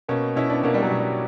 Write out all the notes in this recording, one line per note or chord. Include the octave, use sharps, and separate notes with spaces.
B2 A#3 C#4
B2 C#4 E4
B3 D4
B2 A#3 C#4
G3
F#3 A#3
B2
G3